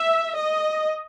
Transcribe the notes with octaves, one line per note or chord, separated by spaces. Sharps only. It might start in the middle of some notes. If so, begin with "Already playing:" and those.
Already playing: E5
D#5